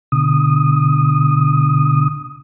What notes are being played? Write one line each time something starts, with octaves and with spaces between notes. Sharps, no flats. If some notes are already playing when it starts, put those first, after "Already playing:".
B2 D3 D#6